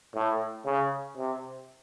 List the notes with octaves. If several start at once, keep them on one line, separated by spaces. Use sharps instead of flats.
A2
C#3
C3